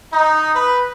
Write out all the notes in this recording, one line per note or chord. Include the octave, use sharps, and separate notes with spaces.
D#4
B4